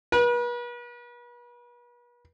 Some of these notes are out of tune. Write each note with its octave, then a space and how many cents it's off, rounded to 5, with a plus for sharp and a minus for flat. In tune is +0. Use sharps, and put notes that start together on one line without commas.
B4 -40